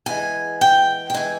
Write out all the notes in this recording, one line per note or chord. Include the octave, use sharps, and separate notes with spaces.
E2 E3 G#3 G#5
G5
G5
E3 G#3 G#5